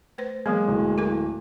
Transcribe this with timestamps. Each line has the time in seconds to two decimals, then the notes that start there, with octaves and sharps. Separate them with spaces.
0.18 A3 B4 C5
0.46 E3 F#3 G#3 A#3 B3
0.68 D1
0.98 E4 A4 A#4